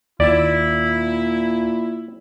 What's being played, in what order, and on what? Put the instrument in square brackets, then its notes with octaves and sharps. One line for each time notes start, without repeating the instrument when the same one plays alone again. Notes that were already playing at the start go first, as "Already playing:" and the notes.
[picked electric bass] D#2 [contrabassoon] A#2 [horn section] E4 [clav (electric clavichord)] D5